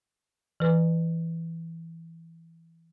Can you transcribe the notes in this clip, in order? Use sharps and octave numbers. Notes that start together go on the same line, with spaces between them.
E3 B4